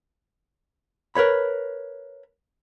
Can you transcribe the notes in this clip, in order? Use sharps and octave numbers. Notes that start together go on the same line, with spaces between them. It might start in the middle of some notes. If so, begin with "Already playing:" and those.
A#4 B4 C#5 B5